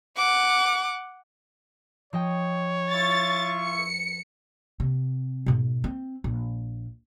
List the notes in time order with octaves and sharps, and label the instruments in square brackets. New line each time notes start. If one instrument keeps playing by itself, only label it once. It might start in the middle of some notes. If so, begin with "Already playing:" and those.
[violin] F#5 D6
[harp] F3 D#5 G5 [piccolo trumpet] C#5
[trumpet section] E4 F4 C#6 [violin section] A6
[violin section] C#7
[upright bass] C3
G#2 B2
C4
A#1